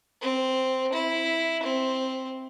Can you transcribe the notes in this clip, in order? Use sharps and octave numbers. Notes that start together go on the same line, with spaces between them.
C4
E4
C4